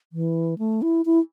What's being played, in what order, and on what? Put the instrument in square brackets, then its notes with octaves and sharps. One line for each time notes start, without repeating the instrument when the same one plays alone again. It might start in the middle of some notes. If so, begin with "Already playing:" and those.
[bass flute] E3
A3
E4
E4